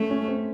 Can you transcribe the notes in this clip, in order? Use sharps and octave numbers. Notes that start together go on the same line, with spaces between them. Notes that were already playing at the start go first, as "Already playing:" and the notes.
Already playing: A3 C#4
C#4
C4